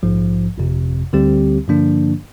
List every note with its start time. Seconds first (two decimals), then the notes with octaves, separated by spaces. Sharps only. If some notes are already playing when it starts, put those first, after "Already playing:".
0.03 A#1 G#2 F3
0.58 G1 F2 C3
1.13 D2 D3 G3 C4 G4
1.68 G2 D3 F3 A#3 D4